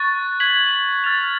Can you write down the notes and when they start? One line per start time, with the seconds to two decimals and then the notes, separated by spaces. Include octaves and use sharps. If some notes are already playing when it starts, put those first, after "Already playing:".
Already playing: C#6 F#6 A6
0.40 G#6 B6 F#7
1.04 F6 A6 F7